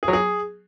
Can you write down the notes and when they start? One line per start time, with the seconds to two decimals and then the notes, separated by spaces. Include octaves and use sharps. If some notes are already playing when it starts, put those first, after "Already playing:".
0.03 G#4
0.08 F#3
0.13 G#4